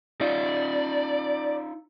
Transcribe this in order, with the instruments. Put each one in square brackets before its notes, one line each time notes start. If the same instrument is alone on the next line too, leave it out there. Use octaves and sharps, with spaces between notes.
[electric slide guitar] D#4 F4 [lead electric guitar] D5